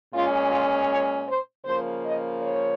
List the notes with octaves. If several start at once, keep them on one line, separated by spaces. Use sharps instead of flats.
A#2 G#3 C#4 F4
F4
C#5
C5
C#3 F3 A#3 C5
D#5
C#5